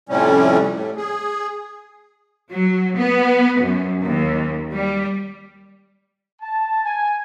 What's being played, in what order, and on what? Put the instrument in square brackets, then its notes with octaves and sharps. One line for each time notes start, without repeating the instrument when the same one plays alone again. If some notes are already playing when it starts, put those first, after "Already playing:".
[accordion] F2 A2 C3 G3 C#4
A2
G#4
[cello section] F#3
B3
F#2
D#2
G3
[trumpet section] A5
G#5